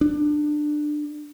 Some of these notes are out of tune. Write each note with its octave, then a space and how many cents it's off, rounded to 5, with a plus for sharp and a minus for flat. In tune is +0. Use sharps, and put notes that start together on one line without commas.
D4 +20